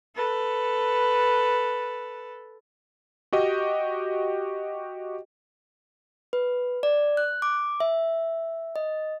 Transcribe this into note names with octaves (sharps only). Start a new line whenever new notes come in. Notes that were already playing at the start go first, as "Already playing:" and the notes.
A4 B4
F#4 G4 D#5 G5
B4
D5
F#6
D6
E5
D#5